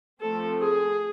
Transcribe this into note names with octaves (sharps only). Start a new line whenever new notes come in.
F3 A3 C4 A4
G#4